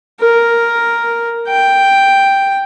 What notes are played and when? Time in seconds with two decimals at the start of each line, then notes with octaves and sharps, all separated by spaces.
0.20 A#4
1.48 G5